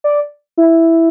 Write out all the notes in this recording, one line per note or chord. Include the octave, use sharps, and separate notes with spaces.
D5
E4